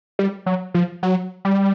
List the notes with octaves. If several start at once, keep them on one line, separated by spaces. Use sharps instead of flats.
G3
F#3
F3
F#3
G3